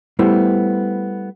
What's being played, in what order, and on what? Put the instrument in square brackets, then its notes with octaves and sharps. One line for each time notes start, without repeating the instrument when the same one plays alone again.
[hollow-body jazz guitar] G3 A3 B3 E4 C5